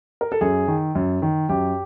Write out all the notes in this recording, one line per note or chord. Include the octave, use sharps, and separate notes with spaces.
A#4
A4
F#2 G#4
D#3
F#2
D#3
F#2 G4